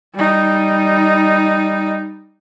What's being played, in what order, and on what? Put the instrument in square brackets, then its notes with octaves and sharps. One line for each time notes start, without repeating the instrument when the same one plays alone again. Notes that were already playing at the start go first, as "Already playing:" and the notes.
[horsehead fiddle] G3 D#4